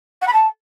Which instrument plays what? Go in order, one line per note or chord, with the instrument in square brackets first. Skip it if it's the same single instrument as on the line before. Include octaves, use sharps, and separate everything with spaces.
[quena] F#5
B5
A5